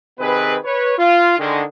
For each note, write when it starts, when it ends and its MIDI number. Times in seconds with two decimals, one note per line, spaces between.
0.20 0.56 48
0.20 0.56 51
0.20 0.56 60
0.20 0.56 68
0.20 0.56 71
0.65 0.93 71
0.65 0.93 73
0.98 1.36 65
1.39 1.63 50
1.39 1.63 51
1.39 1.63 56